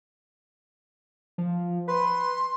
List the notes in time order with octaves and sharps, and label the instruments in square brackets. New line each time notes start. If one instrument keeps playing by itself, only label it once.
[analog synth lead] F3
[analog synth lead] B4 [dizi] C6